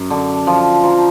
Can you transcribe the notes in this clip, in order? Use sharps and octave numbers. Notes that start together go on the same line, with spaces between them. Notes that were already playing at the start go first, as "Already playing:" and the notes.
Already playing: F#2
D3
F3
F3 A#5